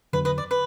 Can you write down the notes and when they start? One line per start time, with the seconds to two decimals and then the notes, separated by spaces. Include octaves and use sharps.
0.13 F2 D3 F#3 D4 B4
0.25 B4 D#5
0.38 D5
0.51 B4